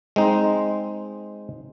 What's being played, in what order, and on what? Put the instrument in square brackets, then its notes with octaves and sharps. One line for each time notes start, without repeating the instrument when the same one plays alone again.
[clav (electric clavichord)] G#3 C4 D#4